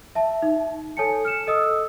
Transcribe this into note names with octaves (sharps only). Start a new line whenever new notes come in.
E5 A5
D#4
A4 C#5 G#5 A5 C#7
F6 C#7 E7
A4 D#5 D#6 E6